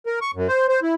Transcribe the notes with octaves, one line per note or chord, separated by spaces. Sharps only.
A#4
C#6
F#2
C5
C5
E4